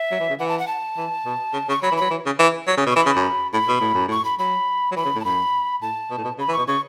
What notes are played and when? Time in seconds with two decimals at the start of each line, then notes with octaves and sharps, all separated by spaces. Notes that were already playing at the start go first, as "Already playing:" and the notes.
Already playing: E5
0.11 F#3
0.20 E3
0.30 C#3
0.39 E3 F#5
0.49 A5
0.59 F#5
0.68 A5
0.97 E3
1.26 B2
1.53 C#3
1.69 C#3 C#6
1.83 F#3 B5
1.92 E3
1.97 F#3 B5
2.11 E3
2.26 C#3
2.39 E3
2.68 F#3
2.77 C#3
2.87 B2
2.91 C#6
2.96 E3 B5
3.06 C#3
3.16 F#2
3.53 A2 B5
3.68 B2
3.81 A2
3.94 F#2
4.08 A2 C#6
4.25 B5
4.39 F#3 B5
4.92 F#3
4.96 E3 B5
5.05 C#3
5.15 A2
5.20 A5
5.25 F#2 B5
5.82 A2 A5
6.11 B2
6.18 A2
6.24 B2
6.38 C#3 B5
6.48 E3
6.52 C#6
6.58 B2
6.68 C#3 C#6